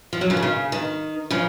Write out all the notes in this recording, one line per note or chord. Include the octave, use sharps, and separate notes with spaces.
F3
F#3
C#3 F3
D#3
C#3
D#3
C#3 F3